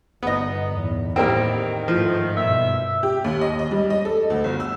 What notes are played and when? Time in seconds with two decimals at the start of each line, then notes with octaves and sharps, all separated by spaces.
0.23 G1 B3 D#4 D#5
0.69 E2 A2
1.16 A2 D#3 G3 A#3 C4
1.88 G#2 F3 A3
2.37 G2 B2 E5
3.03 G4
3.24 D#2
3.41 D#5
3.59 D#5
3.71 G3
3.90 D#5
4.05 A4
4.30 D2
4.44 G1
4.60 E6